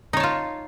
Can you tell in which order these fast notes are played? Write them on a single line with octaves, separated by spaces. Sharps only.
D#4 C#5 A5 F4